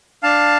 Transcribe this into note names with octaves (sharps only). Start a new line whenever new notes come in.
D4 F5 A5